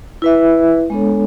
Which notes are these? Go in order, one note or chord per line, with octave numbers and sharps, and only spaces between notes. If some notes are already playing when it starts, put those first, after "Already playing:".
E4 B4 E5
G#3 B3 D4 A4 C#5